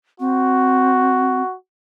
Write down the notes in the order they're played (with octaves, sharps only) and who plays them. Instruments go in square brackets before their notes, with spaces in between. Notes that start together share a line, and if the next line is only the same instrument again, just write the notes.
[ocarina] C4 [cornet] F#4